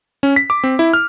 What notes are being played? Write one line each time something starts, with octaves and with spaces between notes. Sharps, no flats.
C#4
B6
D6
C4
E4
F6